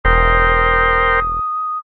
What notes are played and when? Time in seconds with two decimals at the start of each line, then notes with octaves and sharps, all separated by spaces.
0.05 E1 A#4 C5 G5 D#6